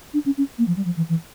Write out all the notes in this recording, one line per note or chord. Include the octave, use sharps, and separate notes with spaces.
D4
C#4
C#4
A#3
F3
G3
F3
E3
E3